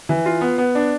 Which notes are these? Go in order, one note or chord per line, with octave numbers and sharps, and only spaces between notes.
E3
F4
B3
B3
D4